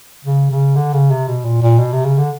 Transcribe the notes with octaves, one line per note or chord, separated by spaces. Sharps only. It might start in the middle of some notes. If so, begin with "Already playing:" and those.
C#3
C#3
D3
C#3
C3
B2
A#2
A#2
B2
C3
C#3
D3